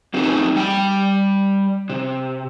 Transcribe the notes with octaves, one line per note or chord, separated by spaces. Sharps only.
F#3 A3 C4 C#4 D#4 G4
G3 G5
C3